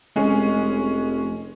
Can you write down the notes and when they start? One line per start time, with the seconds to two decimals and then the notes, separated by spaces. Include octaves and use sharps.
0.16 F1 G#3 C#4